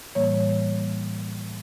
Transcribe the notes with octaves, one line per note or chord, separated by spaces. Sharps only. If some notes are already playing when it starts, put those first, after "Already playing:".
A2 E3 G3 A#3 C#5